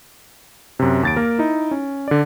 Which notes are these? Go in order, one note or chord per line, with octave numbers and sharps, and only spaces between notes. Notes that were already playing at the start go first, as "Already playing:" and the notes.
F#2 C3
D#2 A6 D7
A#3 A#4
D#4 E4
C#4
D3 D5